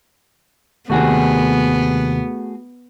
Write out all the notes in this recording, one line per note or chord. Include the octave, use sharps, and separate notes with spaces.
D#2 C3 D#3 A3 B3 F#4 G#4